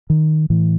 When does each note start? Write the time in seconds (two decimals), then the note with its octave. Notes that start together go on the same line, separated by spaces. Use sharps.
0.10 D#3
0.50 A2 E3